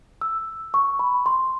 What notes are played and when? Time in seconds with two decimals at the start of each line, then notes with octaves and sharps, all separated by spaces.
0.21 E6
0.74 C#6
0.99 B5
1.26 C6